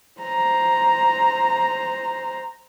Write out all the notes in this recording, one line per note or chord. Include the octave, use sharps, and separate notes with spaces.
C5 A#5